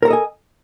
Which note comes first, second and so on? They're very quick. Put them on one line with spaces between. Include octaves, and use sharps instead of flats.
A#4 A#5 A4 D#5 G#5